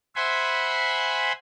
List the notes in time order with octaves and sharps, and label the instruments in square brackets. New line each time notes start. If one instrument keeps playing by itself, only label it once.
[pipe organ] C5 E5 F#5 G#5 B5 C6